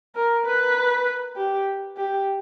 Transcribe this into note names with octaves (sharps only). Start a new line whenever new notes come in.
A#4
B4
G4
G4